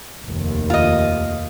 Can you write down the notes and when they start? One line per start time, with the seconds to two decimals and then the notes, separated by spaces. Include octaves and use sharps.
0.24 F1 D#2
0.70 F4 D#5